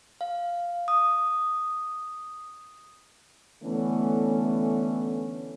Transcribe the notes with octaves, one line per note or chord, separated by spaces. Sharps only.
F5
D#6
D3 E3 A3 B3 C#4